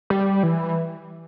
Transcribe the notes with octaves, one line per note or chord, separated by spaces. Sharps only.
G3
E3